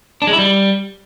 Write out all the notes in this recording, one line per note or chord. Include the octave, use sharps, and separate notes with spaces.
D4
G#3
E4
G3